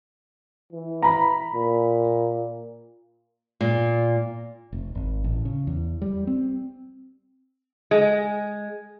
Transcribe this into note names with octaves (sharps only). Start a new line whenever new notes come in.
E3
A#5 B5
A#2
A#2
F1
G#1
A1
C#3
E2
G3
C4
G#3